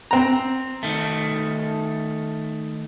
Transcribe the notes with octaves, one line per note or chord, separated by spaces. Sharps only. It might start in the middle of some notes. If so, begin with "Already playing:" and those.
C4 A#5
D#3 A3